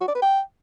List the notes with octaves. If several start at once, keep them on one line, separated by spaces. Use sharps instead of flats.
F#4
D5
B4
G5